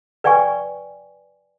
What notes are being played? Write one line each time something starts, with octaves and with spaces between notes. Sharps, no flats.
B4 D5 G5 G#5 C#6